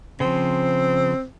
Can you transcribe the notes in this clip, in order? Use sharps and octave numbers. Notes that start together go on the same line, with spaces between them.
C#3 F3 C4